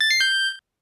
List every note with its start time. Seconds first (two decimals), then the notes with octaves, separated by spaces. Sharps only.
0.01 A6
0.11 C7
0.21 G6